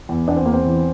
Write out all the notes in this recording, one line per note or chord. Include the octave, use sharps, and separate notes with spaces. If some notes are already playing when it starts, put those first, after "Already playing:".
E2
E2 D4
C4
E2 A#3
C4
E3